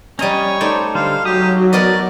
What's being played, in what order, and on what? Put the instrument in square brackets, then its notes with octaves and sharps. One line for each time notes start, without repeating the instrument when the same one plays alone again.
[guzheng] G3 A#5 [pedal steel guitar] C#4 D#5 [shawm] C#5
[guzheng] A3 D#4 D5 [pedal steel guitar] C5
[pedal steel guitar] D3 G3 C5 [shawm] F5
[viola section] F#3 [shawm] G4 [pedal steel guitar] D#6
[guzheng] B3 A#4 D#5 [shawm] D5